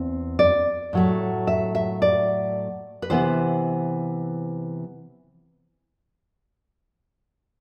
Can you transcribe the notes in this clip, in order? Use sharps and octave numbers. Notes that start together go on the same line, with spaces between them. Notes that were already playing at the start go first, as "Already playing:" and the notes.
Already playing: E2 C4
D5
A2 F#3 A3
E5
E5
D5
B4
C3 E3 B3 C5